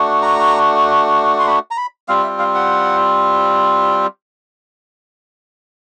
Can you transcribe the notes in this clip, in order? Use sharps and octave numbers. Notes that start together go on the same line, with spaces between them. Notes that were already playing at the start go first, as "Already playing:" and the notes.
Already playing: A3 D4 F#4
A#5
C6
B5
A#5
B5
G3 C4 F4 F5
E5
F5
F#5